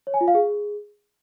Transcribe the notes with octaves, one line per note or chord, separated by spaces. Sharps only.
C#5
G#5
F4
F5
G#4